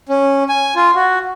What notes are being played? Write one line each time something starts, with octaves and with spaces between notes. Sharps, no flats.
C#4
G#5
F4
F#4